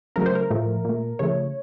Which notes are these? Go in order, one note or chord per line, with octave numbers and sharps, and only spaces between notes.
C#3 F#3 A3 A#4
C5
A#4
A2 F3 A3
A#2 A3
C#3 F3 A3 C#5